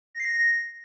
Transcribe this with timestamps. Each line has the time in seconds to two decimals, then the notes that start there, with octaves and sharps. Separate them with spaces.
0.15 A#6
0.20 C7
0.25 A#6